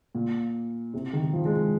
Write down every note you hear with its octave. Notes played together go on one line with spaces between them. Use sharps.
A#2
C3
D#3
F3
G#3